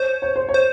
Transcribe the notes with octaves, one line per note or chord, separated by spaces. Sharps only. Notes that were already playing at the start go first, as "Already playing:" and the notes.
Already playing: C5 C#5
C#5
C5
C#5
C5